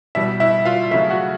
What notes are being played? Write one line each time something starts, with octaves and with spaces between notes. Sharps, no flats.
B2 G3 E4 E5
E4 E5
F4 F5
C#3 F#3 A3 E4 E5
F#4 F#5